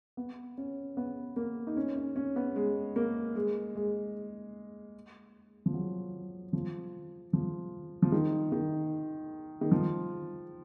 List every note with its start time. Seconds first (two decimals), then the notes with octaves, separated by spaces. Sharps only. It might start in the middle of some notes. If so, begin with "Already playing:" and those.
0.17 B3
0.58 C#4
0.97 B3
1.36 A#3
1.67 D#4
1.77 C#4
1.96 C#4
2.16 C#4
2.36 B3
2.56 G#3
2.96 A#3
3.36 G#3
3.76 G#3
5.66 F3
5.74 F#3
6.53 F3
7.33 F3
8.02 F3
8.12 D#3
8.52 D#3
9.61 D#3
9.72 F3